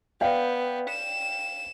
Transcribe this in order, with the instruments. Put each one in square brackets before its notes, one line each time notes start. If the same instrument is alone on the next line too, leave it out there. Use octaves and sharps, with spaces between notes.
[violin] B3 [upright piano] D5 F5 G5
[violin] E7